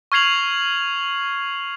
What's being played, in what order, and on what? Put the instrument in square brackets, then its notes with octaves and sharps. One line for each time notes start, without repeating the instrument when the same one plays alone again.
[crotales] C#6 F6 G#6 C7 F7 F#7